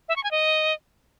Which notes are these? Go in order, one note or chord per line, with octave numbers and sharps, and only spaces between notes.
E5
C#6
G#5
D#5